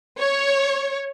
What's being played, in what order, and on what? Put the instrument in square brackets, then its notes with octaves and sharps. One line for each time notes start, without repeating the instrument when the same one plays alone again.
[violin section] C#5